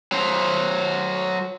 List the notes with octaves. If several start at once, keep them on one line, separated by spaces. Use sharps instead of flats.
F#3 C5